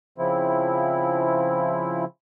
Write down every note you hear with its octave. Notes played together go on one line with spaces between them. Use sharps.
C#3 F3 C4 E4